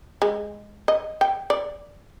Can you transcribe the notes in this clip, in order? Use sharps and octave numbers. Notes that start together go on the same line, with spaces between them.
G#3
D#5
G5
D5